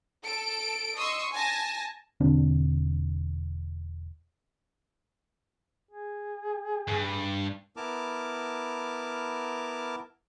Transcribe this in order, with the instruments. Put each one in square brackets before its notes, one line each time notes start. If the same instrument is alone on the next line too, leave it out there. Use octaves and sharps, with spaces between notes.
[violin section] A4 D7
D#5 C6 C#6 D#6 E6
G#5 A5 A#6
[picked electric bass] E1 D3 C4 D4
[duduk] G#4
[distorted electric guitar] G2
[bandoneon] B3 E4 A#4 A5 D6 F6